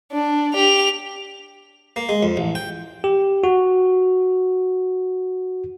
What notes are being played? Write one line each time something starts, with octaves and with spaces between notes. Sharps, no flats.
D4
G4 F7
A#3
G#3
F2
A1
G5
G4
F#4